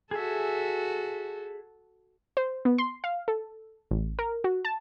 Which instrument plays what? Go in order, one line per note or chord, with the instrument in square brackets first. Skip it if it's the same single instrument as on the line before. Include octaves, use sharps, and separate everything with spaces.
[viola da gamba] F#4 A4 [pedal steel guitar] G#4 E5
[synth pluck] C5
B3
C6
F5
A4
A1
A#4
F#4
A5